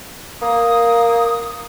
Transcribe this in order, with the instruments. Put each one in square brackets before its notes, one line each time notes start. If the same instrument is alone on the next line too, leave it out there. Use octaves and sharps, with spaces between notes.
[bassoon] A#3 [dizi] D#6